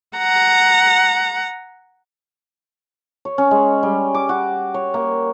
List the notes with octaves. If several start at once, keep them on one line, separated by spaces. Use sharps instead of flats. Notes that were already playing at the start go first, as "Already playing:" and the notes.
F#5 A#5
C#5
C#4
G#3
G3
D6
F#4
C#5
A#3